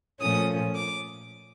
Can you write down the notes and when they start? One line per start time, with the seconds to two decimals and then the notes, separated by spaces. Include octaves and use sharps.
0.20 A#2 F3 A3 C#4 D#6
0.75 D6